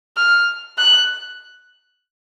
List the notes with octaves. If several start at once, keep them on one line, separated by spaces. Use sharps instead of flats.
F6
F#6